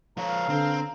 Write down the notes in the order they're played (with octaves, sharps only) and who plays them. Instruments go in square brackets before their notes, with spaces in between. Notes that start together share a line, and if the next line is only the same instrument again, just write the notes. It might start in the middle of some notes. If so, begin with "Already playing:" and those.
[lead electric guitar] F3 C#5 [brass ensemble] A4 B4 F5 [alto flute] A#5
[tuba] D3 [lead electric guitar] C4